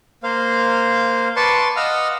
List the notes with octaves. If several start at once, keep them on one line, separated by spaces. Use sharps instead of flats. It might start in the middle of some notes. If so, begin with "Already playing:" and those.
A#3 C5 F5
B4 D5 A5 C6 C#6
D#5 F5 F#5 E6 F6